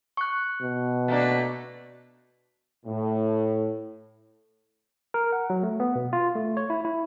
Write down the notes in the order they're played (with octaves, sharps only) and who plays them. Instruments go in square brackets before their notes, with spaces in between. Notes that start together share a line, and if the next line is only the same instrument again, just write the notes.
[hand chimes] C#6 F#6
[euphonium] B2
[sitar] A3 A#3 D4
[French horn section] A2
[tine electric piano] A#4
F#5
F#3
A3
B3
B2
F4
A3
C#5
E4
E4